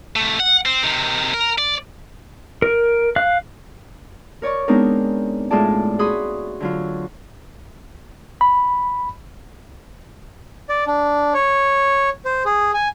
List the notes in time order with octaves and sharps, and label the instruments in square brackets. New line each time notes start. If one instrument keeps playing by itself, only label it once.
[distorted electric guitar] C2 A3
F#5
C4
C3 D#3
A#4
D5
[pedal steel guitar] A#4
F5 F#6
[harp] A#4 C#5 D5 C#6
G#3 B3 C4 D4 D#4 A#4
A2 G#3 F4 G#4 D5 A5
F#4 G#4 B5 C6 D#6
D3 F#3 F4
[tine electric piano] B5
[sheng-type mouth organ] D5
D4
C#5
C5
G#4
G#5